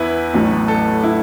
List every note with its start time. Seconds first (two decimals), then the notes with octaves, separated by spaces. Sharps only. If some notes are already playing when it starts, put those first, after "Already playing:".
Already playing: E2 B3 E4 B4
0.34 A1 A2 F#3 A3
0.68 A4
1.03 E4